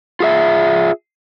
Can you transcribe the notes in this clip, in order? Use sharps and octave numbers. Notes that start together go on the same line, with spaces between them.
F4 G#4 E5